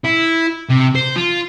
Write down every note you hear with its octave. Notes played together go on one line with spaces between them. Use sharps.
E4
C3
C5
F4